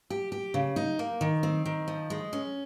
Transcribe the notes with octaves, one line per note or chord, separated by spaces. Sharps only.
G4
G4
C#3
D#4
A#3
D#3
C4
D#3
F3
G#3
C#4